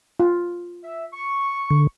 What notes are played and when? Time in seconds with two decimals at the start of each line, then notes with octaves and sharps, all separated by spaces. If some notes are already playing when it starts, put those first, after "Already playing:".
0.20 F4
0.84 E5
1.13 C#6
1.70 D3